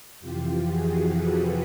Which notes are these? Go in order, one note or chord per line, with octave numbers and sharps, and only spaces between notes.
F2 C3 E3 F4 G4
F#4 G#4
A4 B4